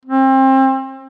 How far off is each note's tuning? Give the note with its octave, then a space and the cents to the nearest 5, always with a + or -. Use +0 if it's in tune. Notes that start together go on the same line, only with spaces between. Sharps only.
C4 +30